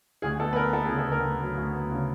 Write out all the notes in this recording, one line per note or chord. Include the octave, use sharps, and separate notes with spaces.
D2 G#4
B3 A4
B4
B3 A#4
B3 A4
G#4
C#3
A4
D2 A#4
D2
F#3
D2
B3
C#3